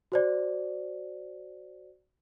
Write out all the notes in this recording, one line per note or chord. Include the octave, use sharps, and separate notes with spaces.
F#4 C5 D5